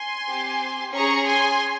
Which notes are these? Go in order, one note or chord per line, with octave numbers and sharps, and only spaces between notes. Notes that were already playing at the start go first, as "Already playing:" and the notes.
Already playing: G#5 C6
C4 G4
C#4 G#4 A#5 C#6
G#5 C6